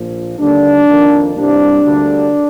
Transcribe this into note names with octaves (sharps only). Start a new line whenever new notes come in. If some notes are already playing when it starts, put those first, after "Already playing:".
Already playing: A#1 A#2 F3
D#2 D3 G3 A#3 D4
F2 D#3 A#3
C2 C3 G3 A#3 D4
D2 D3 G3 A#3